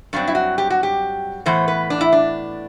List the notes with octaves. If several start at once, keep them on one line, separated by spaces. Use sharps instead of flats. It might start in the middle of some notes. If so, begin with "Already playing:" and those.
G2 F#3 C4 D4
E4
F#4
G4
F#4
G4
A2 E3 B3 C5
B4
D4
E4
D4